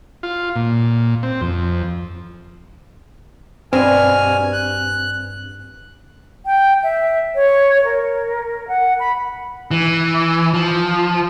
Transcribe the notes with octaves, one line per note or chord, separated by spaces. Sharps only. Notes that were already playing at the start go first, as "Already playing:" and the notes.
F4
A#2
C4
F2
G2 B2 C4 G#5 F6
F#6
G5
E5
C#5
A#4
F#5
B5
E3
F3